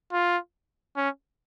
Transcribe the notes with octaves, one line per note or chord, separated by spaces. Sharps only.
F4
C#4